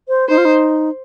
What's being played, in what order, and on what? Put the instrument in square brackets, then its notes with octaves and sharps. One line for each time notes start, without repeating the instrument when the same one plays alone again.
[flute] C5
[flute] D#4 [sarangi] C5
[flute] F4
D#4